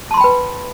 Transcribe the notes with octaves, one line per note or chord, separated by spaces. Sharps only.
B4 G5 A5 B5 C6